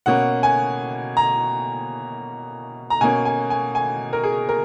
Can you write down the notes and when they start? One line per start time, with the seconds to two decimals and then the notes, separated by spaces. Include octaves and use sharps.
0.06 B2 A#3 C#4 F#5
0.43 G#5
1.17 A#5
2.90 A#5
3.01 B2 A#3 C#4 G#5
3.25 G#5
3.50 G#5
3.75 G#5
4.13 A#4
4.23 G#4
4.49 A#4